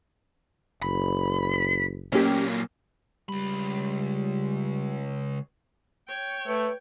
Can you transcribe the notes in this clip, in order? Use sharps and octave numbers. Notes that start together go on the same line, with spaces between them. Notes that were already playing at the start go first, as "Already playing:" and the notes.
F#1 B5
A#2 F#3 A#3 C#4 G4
C#2 G3 B5
C#5 G5
A3 B4